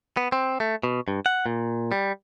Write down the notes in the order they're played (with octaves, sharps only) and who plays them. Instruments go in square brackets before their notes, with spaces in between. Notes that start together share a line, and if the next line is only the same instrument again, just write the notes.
[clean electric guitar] B3
C4
A3
B2
G2
F#5
A#2
G3